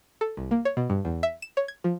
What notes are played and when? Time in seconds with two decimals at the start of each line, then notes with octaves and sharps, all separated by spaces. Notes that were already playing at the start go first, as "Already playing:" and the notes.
0.21 A4
0.37 C2
0.51 A#3
0.65 C#5
0.77 B2
0.90 G2
1.05 E2
1.23 E5
1.42 E7
1.57 C#5
1.68 G#6
1.84 F3